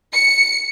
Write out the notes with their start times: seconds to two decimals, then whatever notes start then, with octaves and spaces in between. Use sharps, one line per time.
0.14 C#7